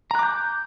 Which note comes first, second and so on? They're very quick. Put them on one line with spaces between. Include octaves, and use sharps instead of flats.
A#5 F#6 D6 G6